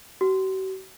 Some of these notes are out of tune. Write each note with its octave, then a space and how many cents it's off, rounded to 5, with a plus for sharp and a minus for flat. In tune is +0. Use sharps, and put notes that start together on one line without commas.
F#4 +45